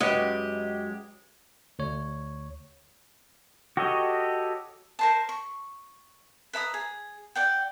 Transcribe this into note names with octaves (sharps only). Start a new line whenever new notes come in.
F#2 G#3 G4 B4 C#5 D#5 E5 F#5
D2 C#5
F#4 G4 A4 C#5 D#5
A#4 C5 A5
C#6
B4 E5 A#5 D#6
G#4
D5 F#5 G5